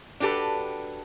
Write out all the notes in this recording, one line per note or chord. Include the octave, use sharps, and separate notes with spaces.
D4 F#4 G4 A4 B4